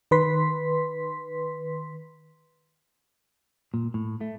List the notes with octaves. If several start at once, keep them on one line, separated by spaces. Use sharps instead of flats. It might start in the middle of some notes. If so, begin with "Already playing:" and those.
D#3 B4 C6 B6
A#2
A2
A3